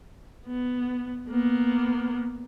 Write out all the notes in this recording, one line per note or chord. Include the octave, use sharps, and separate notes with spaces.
B3
A#3 B3